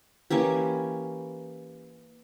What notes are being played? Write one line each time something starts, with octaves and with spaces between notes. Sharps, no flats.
E3 A#3 C#4 G4